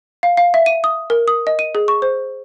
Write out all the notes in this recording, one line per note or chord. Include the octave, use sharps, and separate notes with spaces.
F5
F5
E5
D#7
D#6
A#4
D#6
D#5
D#7
G#4
C#6
C5